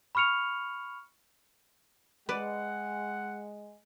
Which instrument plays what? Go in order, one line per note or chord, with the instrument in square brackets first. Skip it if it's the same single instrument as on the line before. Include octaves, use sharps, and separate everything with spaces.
[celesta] B5 C#6 F6 C#7 F7
[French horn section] G#3 [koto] B4 D5 [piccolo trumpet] F#5